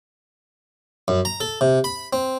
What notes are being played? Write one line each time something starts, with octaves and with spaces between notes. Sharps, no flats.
F#2
A#5
A4
C3
B5
C4